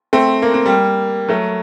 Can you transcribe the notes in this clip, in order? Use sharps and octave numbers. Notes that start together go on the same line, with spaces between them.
A3 C4
A#3
C4
G3 A#3
F#3 A3